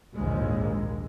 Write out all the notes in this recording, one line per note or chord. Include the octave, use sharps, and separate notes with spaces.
A#1 D#2 G#2 G#3